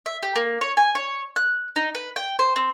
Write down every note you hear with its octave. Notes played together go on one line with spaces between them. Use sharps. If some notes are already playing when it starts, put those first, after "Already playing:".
E5
G4
A#3
C#5
G#5
C#5
F#6
D#4
B4
G5
C5
C4